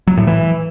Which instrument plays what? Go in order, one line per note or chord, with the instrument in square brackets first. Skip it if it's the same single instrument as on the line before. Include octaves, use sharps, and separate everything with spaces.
[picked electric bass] F#3
A2
E3